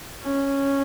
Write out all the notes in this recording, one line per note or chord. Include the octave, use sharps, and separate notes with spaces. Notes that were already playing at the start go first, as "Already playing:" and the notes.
C#4